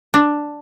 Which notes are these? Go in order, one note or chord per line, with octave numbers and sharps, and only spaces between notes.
D4